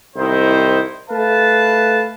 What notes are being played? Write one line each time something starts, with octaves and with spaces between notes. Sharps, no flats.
C2 D#3 D#4 E4 C5
A3 B4 F5 A5